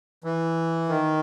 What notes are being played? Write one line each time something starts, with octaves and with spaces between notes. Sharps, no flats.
E3
D#3